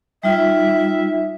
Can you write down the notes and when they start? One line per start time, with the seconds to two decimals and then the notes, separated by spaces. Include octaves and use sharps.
0.23 G3 D#4 F4 E5